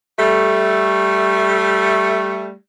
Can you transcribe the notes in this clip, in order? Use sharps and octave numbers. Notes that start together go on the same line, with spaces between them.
G3 A3